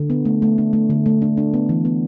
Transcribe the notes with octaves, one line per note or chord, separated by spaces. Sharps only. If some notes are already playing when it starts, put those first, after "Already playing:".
Already playing: D3
B3
A3
A3
D4
A3
D3
A3
D4
D4
B3
E3
B3